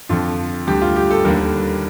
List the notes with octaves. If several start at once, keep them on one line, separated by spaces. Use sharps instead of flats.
F2 D3 F3 F4
D2 D3 G3 G4
F4
G4
A4
D#2 D3 G3 A#4